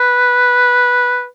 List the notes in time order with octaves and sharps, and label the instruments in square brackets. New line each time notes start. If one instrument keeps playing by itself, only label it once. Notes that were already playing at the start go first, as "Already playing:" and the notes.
Already playing: [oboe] B4